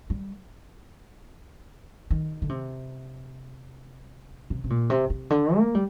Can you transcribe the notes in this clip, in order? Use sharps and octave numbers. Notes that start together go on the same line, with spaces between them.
G3
D#3
D3
C3
C3
C3
A#2
C3
C3
D3
A#3
G3